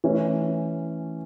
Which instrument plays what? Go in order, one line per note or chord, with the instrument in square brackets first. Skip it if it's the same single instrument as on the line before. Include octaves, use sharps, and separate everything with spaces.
[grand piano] E3 A3 C#4